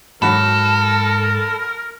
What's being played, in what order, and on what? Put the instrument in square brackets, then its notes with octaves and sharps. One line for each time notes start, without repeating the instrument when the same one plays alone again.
[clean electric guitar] G#2 [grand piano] F#3 F#4 B5 [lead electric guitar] A4 [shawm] A#4